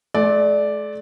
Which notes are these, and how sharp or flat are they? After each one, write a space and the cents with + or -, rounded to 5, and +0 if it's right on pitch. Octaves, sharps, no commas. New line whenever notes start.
A3 -45 D5 +0